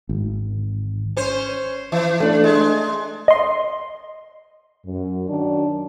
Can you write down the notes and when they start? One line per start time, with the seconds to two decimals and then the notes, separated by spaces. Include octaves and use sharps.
0.09 G#1
1.17 C#4 C5
1.92 E3
2.20 A3 D4
2.44 G#3
3.28 D#5 C6
4.85 F#2
5.28 D#3 F#3 D4